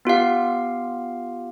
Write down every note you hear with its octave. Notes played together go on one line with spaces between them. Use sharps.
B3 F4 G4 F5